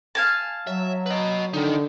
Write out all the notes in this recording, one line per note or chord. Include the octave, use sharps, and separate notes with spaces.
F5 G#5 A5
F#3 E5
B4 D#5
D3 D#3 D#4